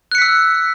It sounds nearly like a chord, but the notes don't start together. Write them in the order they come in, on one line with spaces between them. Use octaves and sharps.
F#6 C#7 B6 E6